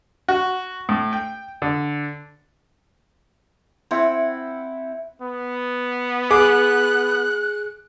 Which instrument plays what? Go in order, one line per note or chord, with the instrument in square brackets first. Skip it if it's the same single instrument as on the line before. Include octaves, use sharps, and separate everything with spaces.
[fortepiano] F#4
A2
G5
D3
[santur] C4 E4 F#5
[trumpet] B3
[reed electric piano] G#4 [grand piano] D6 [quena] F#6